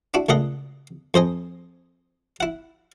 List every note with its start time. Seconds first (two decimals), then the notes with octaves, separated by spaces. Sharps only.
0.14 D4 E4 F#4
0.29 C#2 A#2 A3 D#5 F#5
1.14 F2 C5 D#5 G#5
2.40 E4 F#5